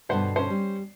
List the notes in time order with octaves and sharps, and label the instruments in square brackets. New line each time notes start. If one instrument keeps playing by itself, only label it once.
[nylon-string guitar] G2 B2 D3 [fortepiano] B4 C5 F#5
[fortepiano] C#4 C5
[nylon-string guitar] G3